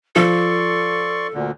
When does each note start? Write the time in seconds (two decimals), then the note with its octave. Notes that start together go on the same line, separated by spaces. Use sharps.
0.16 F3 A4 D5 C6 C#6
1.34 D2 A#2 D3